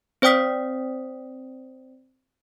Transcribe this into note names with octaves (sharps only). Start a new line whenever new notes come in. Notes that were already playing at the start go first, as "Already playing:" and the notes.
C4 C5 D5 G5 D#6 B6